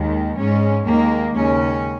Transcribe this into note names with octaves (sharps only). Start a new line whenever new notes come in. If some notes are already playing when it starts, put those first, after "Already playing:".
Already playing: D#2 D#3 G#3
G#2 G#3 C#4
D#2 D#3 G#3 A#3
D#2 C#3 G#3 C#4